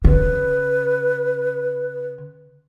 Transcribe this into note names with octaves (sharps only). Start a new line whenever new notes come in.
C#3 B4